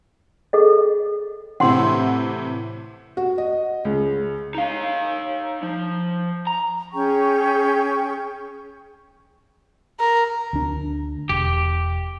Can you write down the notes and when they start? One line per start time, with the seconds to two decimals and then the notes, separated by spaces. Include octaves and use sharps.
0.53 G#4 A4 D#5
1.60 A2 C3 E3 F#5 C6
3.17 F#4
3.38 D#5
3.85 C#2
4.55 D#4 F5
5.63 F3
6.47 A#5
6.92 C#4 G#4 G5 C#6
9.99 A#4
10.53 D2 D4
11.29 E1 G4